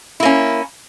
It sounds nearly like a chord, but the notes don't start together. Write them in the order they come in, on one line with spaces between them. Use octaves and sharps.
E4 A#3 C#4